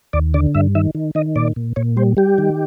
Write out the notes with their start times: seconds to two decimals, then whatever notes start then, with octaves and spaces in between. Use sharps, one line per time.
0.13 D#2 D5
0.34 D3 D5
0.55 G2 E5
0.75 D#3 E5
0.95 D#3
1.15 D#3 D#5
1.36 A#2 D5
1.56 A#2
1.76 A#2 C#5
1.97 G3 C5
2.17 G3 G4
2.38 D#3